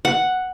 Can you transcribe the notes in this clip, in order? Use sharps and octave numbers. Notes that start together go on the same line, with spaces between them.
F#5